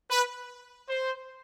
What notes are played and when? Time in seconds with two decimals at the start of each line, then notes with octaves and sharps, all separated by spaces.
0.10 B4
0.89 C5